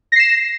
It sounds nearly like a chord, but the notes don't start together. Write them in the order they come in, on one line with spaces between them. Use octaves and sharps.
A#6 C7 E7